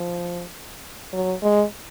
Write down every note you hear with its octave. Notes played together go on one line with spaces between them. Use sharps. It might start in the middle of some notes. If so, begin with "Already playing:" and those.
Already playing: F3
F#3
G#3